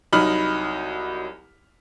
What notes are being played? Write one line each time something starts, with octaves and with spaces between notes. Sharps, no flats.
C2 F#3 D#4 B5 F6 F#7